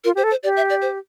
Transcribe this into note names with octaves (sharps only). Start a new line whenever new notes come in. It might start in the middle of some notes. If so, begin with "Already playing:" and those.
F4 A#4
G4 C5
A4
C5
G4 D5
E5
D5
C5